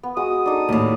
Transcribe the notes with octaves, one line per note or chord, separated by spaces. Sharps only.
B3
G#3 F#4 D#6
D4 D#4 A4
D#2 A2